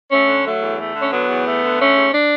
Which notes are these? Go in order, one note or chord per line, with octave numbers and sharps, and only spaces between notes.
A3 C#4
D3
F#3 A3
E2
A3
D3
C#4
F#3 B3
E2
A3
D3
A3 C#4
G#2
D4